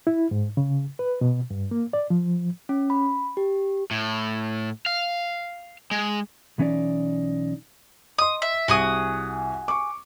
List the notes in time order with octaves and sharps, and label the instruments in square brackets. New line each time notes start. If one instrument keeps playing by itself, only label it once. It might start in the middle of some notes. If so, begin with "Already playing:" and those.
[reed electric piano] E4
G#2
C#3
B4
B2
G2
A#3
D5
F3
[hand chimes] C#4
B5
G4
[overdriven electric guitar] A2
F5
G#3
[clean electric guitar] B1 E3 C#4 D#4 D5
[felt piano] D#5 C6 [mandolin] D#6
[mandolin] E5
[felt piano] C2 [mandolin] F#4 G#4 D#6
[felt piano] C#6 D6